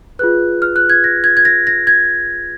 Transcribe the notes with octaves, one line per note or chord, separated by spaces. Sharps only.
F4 G#4 B4 F#6
F6
F#6
G#6
A#6
G#6
G#6
A#6
A#6
G#6